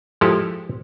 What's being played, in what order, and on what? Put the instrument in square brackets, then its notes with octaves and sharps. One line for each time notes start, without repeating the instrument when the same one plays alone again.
[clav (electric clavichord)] F3 G#3 E4 G4 A4 A#4